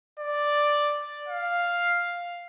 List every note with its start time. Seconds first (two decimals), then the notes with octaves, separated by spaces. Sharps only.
0.19 D5
1.28 F5